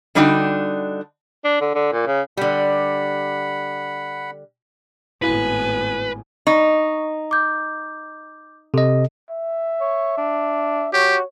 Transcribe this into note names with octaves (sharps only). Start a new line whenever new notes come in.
D3 G3 D4 D#4 F#4 G5
D4
D3
D3
A#2
C#3
D3 G3 F#5 B5
G#1 A2 B3 E4 F#4 B4 F5 G#5
D#4 C#6
D6 G6
C3 A4 D#5
E5
C#5
D4
F#4 G4 C#5